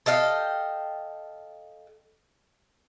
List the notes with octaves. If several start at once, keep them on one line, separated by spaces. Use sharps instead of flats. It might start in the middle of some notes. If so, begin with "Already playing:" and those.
A4 D#5 F5 G5